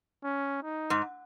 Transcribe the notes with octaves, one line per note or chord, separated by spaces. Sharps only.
C#4
D#4
G#2